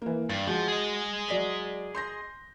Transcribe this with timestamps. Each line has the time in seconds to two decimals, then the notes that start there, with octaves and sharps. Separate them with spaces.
0.02 E3 A#3
0.30 G2 A6
0.47 F3 G#3 F#4
0.68 G#4 D#5
1.29 F#3 D5 B6
1.95 C6 G6 A#6